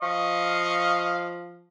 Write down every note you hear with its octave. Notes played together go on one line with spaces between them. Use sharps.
F3 D#5 F5 C#6